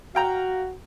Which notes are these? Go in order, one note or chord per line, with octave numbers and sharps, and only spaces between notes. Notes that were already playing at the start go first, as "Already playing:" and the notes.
F#4 F5 G5 A#5